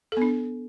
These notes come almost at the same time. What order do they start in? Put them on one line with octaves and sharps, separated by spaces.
A4 B3 D4